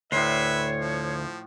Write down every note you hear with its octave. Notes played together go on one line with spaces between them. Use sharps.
D2 A2 B4 C#5 E5 C6
F3